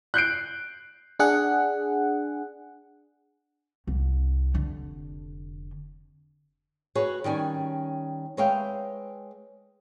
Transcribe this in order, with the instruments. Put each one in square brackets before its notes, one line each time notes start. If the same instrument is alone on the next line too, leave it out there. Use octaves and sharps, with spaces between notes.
[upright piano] F#6 G6 C7 D7
[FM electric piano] D4 G#4 F#5
[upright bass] C2
F1 D3
[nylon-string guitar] F#4 G#4 B4 C#5
D#3 G3 C#4 G#5
G#3 B4 C#5 E5 F5 G5